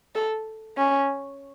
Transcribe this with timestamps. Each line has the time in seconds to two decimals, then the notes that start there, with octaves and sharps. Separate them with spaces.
0.15 A4
0.77 C#4